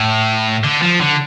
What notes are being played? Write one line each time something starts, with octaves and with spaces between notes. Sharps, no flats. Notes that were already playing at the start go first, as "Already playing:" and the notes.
Already playing: A2
D3
F3
D3